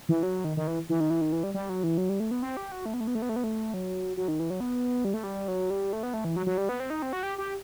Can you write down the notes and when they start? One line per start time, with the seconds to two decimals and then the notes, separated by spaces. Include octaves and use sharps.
0.09 E3
0.23 F#3
0.44 D#3
0.57 D#3
0.67 E3
0.89 E3
1.00 D#3
1.10 E3
1.21 D#3
1.32 E3
1.43 G3
1.54 G3
1.69 F#3
1.83 E3
1.98 F#3
2.09 G3
2.20 A3
2.31 B3
2.42 C4
2.57 G4
2.72 F#4
2.86 A3
2.94 B3
3.00 A3
3.07 B3
3.15 A3
3.22 B3
3.29 A3
3.36 B3
3.44 A3
3.74 F#3
4.17 F#3
4.28 D#3
4.40 E3
4.50 F#3
4.60 B3
5.05 G3
5.14 A3
5.24 G3
5.48 F#3
5.70 G3
5.93 A3
6.03 B3
6.14 A3
6.25 E3
6.36 F#3
6.46 F#3
6.58 G3
6.69 B3
6.80 C4
6.90 D#4
7.02 C4
7.13 F#4
7.23 G4
7.38 G4